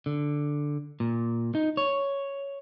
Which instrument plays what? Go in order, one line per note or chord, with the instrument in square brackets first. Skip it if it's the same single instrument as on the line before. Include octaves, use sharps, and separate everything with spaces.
[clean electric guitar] D3
A#2
D#4
C#5